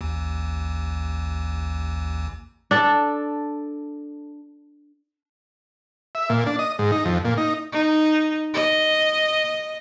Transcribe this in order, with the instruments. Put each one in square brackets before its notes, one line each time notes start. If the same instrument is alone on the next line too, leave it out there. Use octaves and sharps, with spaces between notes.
[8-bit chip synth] A1 D#2
[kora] D4 A4
[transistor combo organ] E5
A#2
D4
D#5
G#2
D#4
F2
A#2
D#4
[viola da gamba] D#4
D#5